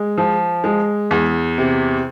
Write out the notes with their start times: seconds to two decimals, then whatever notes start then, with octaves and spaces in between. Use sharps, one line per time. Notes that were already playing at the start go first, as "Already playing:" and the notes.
Already playing: G#3
0.18 F3
0.64 G#3
1.11 E2
1.58 C3